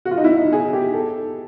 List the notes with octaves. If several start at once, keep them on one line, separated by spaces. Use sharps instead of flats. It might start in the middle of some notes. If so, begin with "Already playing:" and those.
F#4
F4
D#4
E4
D#4
G#4
G4
A4